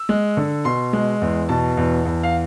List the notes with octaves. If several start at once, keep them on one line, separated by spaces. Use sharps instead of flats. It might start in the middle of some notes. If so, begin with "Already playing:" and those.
Already playing: E6
G#3
D3
B2 C6
G#3
E2
B2 A5
E2
E2
F5